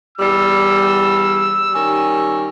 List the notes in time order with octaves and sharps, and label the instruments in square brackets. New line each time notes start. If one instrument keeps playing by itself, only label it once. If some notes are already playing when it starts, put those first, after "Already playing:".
[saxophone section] E2 G3 [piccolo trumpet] E6
[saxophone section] D#3 G3 C#4